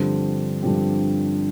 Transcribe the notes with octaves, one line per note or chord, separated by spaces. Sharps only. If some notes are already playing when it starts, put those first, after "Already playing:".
Already playing: G2 D3 F3 C4 G4
G2 D3 F3 C4 G4